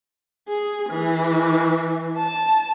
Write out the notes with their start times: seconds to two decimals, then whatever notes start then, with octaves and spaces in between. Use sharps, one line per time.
0.48 G#4
0.90 E3
2.18 A5